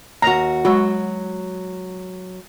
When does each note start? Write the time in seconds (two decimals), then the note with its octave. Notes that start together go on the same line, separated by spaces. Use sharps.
0.22 D#2 F#4 A#5
0.65 F#3 G#3 F#4 B5